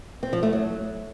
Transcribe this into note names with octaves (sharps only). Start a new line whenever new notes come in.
C4
F3
A3
F#3